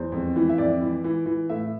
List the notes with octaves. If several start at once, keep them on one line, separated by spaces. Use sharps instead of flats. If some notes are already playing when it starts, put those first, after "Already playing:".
Already playing: E2 C5
F2
E3
E5
F2 D5
E3
E3
E3
A2 E5